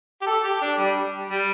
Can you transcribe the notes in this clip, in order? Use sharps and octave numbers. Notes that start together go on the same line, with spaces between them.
G4
A4
G4
D4
G3
G3